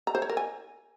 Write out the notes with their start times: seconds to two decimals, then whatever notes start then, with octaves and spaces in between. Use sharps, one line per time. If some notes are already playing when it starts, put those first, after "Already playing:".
0.07 A#5
0.15 C5
0.22 C#5
0.30 A#4
0.37 G#5